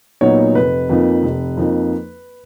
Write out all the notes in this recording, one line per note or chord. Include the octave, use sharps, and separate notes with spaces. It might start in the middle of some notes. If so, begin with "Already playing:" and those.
A#2 F#3 B3 D#4 C#5
F1 B4
F2 F3 A#3 D#4
F1
F2 F3 A#3 D#4